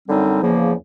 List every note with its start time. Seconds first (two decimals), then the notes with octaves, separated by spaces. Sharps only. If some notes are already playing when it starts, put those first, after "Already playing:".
0.08 F#2 D3 G3 C4 D#4
0.41 E2 C#3 F3 A#3